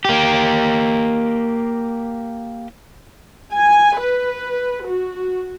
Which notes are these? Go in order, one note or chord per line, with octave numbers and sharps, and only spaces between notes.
A#3 G4
G#5
B4
F#4